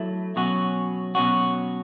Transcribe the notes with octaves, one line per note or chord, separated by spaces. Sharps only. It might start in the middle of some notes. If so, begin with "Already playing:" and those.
Already playing: F#3 A3 E4
B2 F#3 C#4 F#4
B2 F#3 C#4 F#4